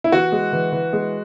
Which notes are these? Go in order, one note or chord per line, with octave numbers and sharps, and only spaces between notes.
E4
E3 F#4
G#3
E3
E3
G#3